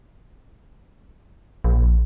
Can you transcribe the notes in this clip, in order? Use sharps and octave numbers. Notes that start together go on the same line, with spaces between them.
A#1